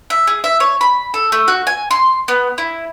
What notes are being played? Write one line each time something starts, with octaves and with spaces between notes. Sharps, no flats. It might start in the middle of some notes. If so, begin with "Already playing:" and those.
E5
G#4
E5
C#5
B5
A4
A3
F#4
G#5
C6
B3
E4